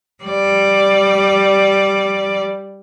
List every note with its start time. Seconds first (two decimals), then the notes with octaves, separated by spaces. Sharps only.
0.24 G3 D5